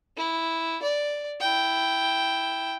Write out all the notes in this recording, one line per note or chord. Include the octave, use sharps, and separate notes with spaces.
E4
D5
E4 G5